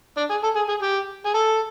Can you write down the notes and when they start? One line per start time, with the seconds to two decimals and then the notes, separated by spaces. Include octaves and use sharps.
0.17 D4
0.30 G#4
0.43 A4
0.56 G#4
0.69 G#4
0.82 G4
1.25 G#4
1.34 A4